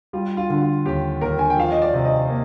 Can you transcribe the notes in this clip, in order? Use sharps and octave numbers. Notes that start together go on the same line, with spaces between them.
G3 F4
F4
D3
F4
D#2 G4
D#2 A#4
G#5
G5
F3 F5
D#5
D5
C3
D#5
A#3